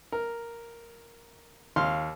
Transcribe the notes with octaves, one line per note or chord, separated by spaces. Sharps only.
A#4
D#2 F5 C6 F6